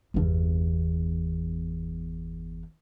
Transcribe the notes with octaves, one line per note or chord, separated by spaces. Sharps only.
G1 E2